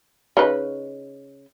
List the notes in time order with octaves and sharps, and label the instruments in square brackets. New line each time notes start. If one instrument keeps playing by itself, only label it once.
[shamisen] C#3 D#4 B4